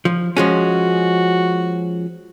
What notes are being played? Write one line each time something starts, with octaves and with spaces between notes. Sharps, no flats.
F3
F3 G#3 C#4 F#4